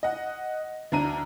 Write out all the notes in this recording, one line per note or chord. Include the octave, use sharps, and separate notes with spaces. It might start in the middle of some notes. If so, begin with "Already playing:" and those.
D#5 F#5
D2 D4 A#5 D#7